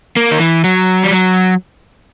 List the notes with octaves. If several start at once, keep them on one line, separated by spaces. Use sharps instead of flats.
A#3
D#3
E3
F#3
G3
F#3